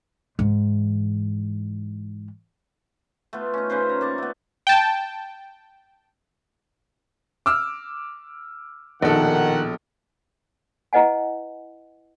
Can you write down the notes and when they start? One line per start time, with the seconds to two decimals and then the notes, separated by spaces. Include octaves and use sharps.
0.39 G#2 E3
3.33 A3 B3 F4
3.54 C#4 D#4
3.70 C#3 C#4 B4 C5
3.89 A#5
4.01 A#3 D5 C#6
4.18 A3 B3
4.67 G5 A5
7.46 D6 E6 F6
9.03 A#1 B2 D#3 A4 F#5
10.93 E4 B4 D#5 F#5 G#5